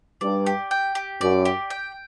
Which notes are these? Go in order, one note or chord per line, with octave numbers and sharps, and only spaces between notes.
G2 D5
G4
G5
G4
F#2 D5
G4
G5